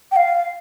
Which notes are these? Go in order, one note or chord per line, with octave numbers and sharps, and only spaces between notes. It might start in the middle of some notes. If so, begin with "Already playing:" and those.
G5
F5